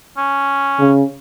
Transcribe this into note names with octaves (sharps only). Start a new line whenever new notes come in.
C#4
C#3